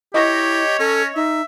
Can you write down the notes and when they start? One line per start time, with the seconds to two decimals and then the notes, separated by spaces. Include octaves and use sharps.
0.14 E4 G4 C#5 D#5 C#6 A#6
0.80 C#4 A4
1.16 D#4 E5